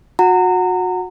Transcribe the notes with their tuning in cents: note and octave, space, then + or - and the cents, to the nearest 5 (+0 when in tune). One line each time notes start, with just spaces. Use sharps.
F#4 -30 F#5 +0 A#5 -30